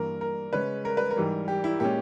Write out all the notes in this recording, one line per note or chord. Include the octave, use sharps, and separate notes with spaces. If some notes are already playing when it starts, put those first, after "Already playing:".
Already playing: G2 E3 A#3 A#4
A#4
C#3 G#3 C#4 B4
A#4
B4
A#4
G#2 E3 G3
G4
E4
A#2 G#3 C#4 G4